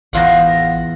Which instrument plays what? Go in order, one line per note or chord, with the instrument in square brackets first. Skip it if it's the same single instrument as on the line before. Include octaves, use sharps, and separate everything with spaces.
[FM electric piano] A1 F5 A#6 [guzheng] E2 F4 F#5